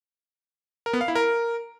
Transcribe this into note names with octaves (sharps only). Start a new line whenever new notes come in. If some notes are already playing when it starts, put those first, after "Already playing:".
A#4
B3
F5
E4
A#4